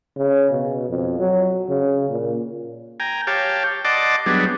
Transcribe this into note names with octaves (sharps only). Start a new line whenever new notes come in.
C#3
B2
F2
F#3
C#3
A#2
G5 G#5 A#5
G4 C#5 F5 G5 A5
D5 D#5 F#5 A5 C6 D6
F#3 G3 B3 D4 G#4